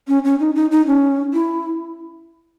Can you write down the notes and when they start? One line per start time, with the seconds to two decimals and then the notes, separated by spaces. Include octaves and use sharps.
0.08 C#4
0.25 C#4
0.40 D#4
0.55 D#4
0.71 D#4
0.87 C#4
1.33 E4